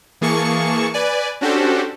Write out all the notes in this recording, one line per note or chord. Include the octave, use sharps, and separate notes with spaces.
E3 A#3 G#4 A5 C#6 C#7
B4 D5 G#5
C#4 D4 F#4 G4 A4 C5